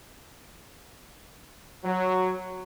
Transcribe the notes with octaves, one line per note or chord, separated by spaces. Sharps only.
F#3